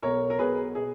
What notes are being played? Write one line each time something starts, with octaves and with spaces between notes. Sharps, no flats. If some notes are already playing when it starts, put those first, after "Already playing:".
B1 B2 A#4 C#5
A#4
B1 B2 G#4 B4
B2 G#4